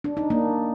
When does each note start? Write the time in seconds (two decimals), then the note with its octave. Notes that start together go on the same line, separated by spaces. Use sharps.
0.04 D4
0.17 D#4
0.30 A#3 D4